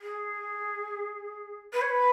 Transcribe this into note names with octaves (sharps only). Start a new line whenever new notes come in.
G#4
B4
C#5
B4